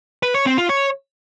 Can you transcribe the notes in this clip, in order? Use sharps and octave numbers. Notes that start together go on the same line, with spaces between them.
B4
C#5
C4
F4
C#5